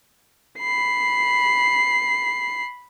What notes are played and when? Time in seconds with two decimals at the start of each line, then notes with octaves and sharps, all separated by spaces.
0.59 B5 C7